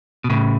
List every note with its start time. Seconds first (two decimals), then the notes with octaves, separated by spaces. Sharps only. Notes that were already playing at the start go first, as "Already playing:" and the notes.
0.24 B2
0.30 A2 C#3